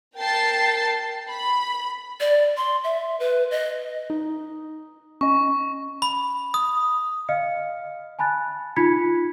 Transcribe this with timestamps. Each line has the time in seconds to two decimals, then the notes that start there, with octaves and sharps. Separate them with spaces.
0.18 A#4 G5 A5 A6 C7
1.29 B5
2.20 D5
2.57 C6
2.84 E5
3.20 B4
3.51 D#5
4.10 D#4
5.21 C#4 D#5 C#6
6.02 B5
6.54 D#6
7.29 D#5 F5 F6 C#7
8.19 G#5 A5 B5 F#6 A6
8.76 D#4 F4 B5 G#6 B6 C#7